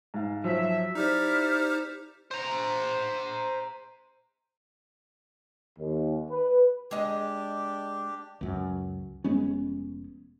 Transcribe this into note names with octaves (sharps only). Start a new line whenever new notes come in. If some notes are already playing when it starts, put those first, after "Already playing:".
G#2 F5
F3 F#3 E5
D#4 E4 G4 C5 D5 F6
C5 A#5
D#2
B4
G#3 D4 G4 D#5
C#2 F#2
F1 G#3 B3 C#4